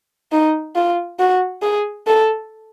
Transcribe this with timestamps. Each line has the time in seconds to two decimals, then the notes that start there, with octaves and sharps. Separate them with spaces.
0.32 D#4
0.76 F4
1.20 F#4
1.63 G#4
2.07 A4